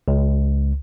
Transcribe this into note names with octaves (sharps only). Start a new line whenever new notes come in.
C#2